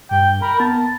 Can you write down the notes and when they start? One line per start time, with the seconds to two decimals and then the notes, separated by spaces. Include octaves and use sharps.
0.11 G2 G5
0.42 A#4 B5
0.60 B3 A5